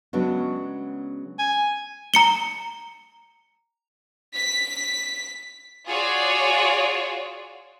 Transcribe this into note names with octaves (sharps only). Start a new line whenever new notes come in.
C#3 F#3 G#3 B3 C#4 D4
G#5
A#5 C#7 G7
B6
F4 F#4 G#4 C#5 D5